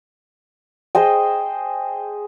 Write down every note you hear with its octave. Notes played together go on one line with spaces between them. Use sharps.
G#4 C5 D#5 G5